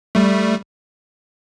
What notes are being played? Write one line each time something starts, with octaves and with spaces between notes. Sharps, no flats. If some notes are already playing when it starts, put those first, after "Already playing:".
G3 A3